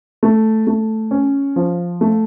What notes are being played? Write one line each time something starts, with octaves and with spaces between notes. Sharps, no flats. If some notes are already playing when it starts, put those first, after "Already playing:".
A3
A3
C#4
F3
A3